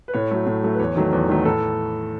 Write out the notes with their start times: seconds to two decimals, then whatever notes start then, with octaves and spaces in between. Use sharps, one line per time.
0.08 B4
0.14 A2 C#5
0.31 F#3 A3
0.47 A2
0.63 F#3 A3
0.74 B4
0.80 E2 C#5
0.96 D#3 F#3 A3
1.13 E2
1.29 D#3 F#3 A3
1.45 A2 A4